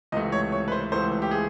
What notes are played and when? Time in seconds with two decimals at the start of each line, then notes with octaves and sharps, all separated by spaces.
0.12 C#2 C3 E3 A3 D#5
0.32 C#5
0.52 C#5
0.68 B4
0.72 C5
0.92 C#2 C3 E3 A3 C5
1.22 G4
1.31 G#4